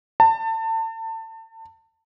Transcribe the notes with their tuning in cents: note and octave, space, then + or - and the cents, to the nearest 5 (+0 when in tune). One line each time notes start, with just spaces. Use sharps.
A5 +30